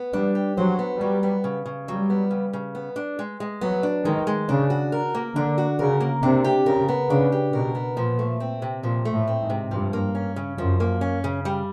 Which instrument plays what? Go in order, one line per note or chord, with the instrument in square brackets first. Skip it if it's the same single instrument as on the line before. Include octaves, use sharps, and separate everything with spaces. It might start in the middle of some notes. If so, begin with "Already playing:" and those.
Already playing: [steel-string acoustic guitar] B3
[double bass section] G3 [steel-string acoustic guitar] D4
[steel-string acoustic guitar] G4
[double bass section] F#3 [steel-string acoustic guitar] C5
[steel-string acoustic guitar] B3
[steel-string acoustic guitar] F#3 [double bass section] G3
[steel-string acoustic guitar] B3
C#3
C#3
[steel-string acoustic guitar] F#3 [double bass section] G3
[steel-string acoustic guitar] B3
C#3
C#3
B3
D4
G#3
G#3
[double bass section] F#3 [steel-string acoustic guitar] B3
[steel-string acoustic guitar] D4
[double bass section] D#3 [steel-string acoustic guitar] G#3
[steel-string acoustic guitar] G#3
[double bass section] C#3 [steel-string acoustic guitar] D4
[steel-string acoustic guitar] F#4
A#4
A#3
[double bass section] D3 [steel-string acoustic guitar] D4
[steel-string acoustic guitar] F#4
[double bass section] C#3 [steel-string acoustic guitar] A#4
[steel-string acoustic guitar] A#3
[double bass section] C3 [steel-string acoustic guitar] D4
[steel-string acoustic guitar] G4
[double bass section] C#3 [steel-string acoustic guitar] A#4
[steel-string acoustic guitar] B3
[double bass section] C#3 [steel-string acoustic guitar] D4
[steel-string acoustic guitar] G4
[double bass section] B2 [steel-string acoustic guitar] A#4
[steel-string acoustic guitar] B3
[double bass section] A#2 [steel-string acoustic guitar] F3
[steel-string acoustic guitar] A3
C4
C3
[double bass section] A#2 [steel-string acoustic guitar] F3
[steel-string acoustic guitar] A3
[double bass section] A2
[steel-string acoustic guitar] C4
[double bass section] G#2
[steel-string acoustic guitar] C3
[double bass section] G2 [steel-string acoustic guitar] F3
[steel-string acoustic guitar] A#3
C#4
C#3
[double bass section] F#2 [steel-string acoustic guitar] F3
[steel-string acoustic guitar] A#3
C#4
C#3
G3